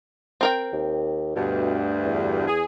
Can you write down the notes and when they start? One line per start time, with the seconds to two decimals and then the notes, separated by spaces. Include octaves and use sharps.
0.41 C4 A#4 G5
0.72 D#2
1.36 D2 G2 B2
2.05 E2
2.47 G#4